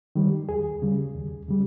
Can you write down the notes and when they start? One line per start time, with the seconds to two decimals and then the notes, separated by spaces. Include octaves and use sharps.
0.16 D#3 G3
0.49 D#2 G#4
0.82 C#3 G3
1.15 D#2
1.48 C#3 G3